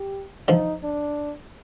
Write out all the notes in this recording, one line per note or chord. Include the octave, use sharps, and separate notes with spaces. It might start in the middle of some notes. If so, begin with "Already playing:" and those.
Already playing: G4
D3 F3 D#4
D4